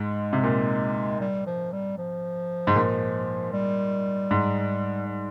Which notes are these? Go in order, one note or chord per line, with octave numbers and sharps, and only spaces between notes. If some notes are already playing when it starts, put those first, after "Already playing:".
Already playing: G#2 G#3
C3
A#2
G3
F3
G3
F3
G#2
A#2
G3
G#2
G3